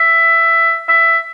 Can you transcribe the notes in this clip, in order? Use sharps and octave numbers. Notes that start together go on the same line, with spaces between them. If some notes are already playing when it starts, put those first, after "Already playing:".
Already playing: E5
E5